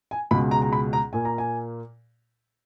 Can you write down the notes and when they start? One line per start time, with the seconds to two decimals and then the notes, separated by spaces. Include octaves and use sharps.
0.11 G#5
0.31 C#2 B2 G#3 B5
0.51 A#5
0.62 A#5
0.73 B5
0.93 A#5
1.13 A#2 A#3 G#5
1.25 A#5
1.38 G#5